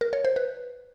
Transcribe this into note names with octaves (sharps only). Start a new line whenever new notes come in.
A#4
C#5
C5
B4